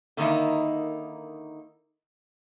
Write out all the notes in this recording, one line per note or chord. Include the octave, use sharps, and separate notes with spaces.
D3 D#3 A#3 D#4 E4